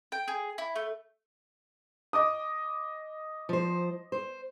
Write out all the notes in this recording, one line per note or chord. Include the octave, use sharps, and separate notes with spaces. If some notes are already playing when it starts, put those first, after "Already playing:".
G5
G#4
E4
A3
D#5 D6 D#6
F3 C5
C5